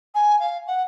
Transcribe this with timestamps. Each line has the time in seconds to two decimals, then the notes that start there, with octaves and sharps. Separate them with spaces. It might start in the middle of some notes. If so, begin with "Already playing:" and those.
0.14 G#5
0.39 F5
0.67 F#5